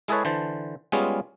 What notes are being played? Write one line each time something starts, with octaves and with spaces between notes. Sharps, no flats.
G#3 E4 G#4 A4 B4 C#5
D3 E3 C5 A5
G3 G#3 B3 C#4 F4 G#4